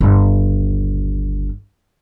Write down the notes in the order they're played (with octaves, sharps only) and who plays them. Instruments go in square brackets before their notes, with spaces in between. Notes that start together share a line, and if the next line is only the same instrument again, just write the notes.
[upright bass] G1 D#2